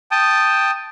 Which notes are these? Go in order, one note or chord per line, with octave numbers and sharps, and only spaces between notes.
G5 A5 D#6